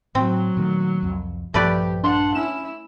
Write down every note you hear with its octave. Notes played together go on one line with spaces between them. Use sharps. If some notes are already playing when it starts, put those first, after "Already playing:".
A2 F#3 C4
A#2 D#3 A3
C2 F2
A#1 G2 F3 A3 G4 B4 D5
D4 F#5 A5 C6
C#4 E4 E7